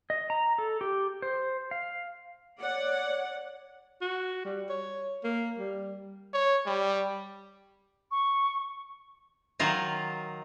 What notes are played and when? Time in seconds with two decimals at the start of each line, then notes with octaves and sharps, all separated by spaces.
0.10 D#5
0.30 A#5
0.58 A4
0.81 G4
1.22 C5
1.71 F5
2.61 C#5 D5 F#5
4.02 F#4
4.45 G3
4.69 C#5
5.24 A#3
5.58 G3
6.34 C#5
6.66 G3
8.11 C#6
9.60 D#3 F#3 F4 D#5